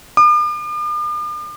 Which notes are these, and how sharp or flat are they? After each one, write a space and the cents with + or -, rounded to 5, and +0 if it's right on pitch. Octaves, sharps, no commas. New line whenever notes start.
D6 +45